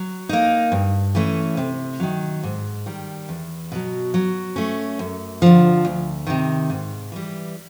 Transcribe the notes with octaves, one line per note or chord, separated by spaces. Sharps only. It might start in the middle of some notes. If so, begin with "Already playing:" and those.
Already playing: F#3
A#3 D#4
G2
E3 A3 C#4
C3
D#3 F#3
G#2
D#3 G3
E2
B2 F#3
F#3
A3 C#4
F#2
D3 F3
D2
C3 D#3
G#2
E3 G3